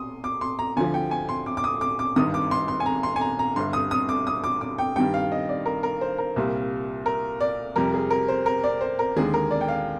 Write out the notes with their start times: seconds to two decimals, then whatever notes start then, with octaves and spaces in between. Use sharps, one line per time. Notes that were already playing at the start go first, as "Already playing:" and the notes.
Already playing: C6 D#6
0.24 D6
0.41 C6
0.59 A#5
0.76 D2 D3 F3 G#5
0.94 G5
1.11 G#5
1.29 C6
1.46 D6
1.57 D6
1.64 D#6
1.81 D6
1.99 D6
2.16 G#1 G2 D#3 D#6
2.34 D6
2.51 C6
2.68 C6
2.80 G#5
2.86 A#5
3.03 C6
3.16 G#5
3.21 A#5
3.39 A#5
3.56 G1 G2 D3 C6
3.73 D#6
3.91 D#6
4.09 D6
4.27 D#6
4.44 D6
4.61 D6
4.78 G5
4.96 G2 D#3 G3 G5
5.14 F5
5.32 D#5
5.49 D5
5.66 A#4
5.83 A#4
6.01 C5
6.18 A#4
6.36 C2 A#2 G3
7.06 A#4
7.41 D5
7.76 F2 C3 G3 A#4
7.94 G#4
8.11 A#4
8.28 C5
8.46 A#4
8.64 D5
8.81 C5
8.99 A#4
9.17 D#2 D3 G#3 G#4
9.34 A#4
9.51 D5
9.61 G5
9.68 F5